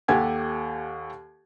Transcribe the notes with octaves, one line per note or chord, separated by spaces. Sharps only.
D#2 G4 A4 F#5 G#5 G#6